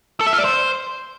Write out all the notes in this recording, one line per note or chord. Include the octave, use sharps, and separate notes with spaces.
A4
E5
F4
D5
C5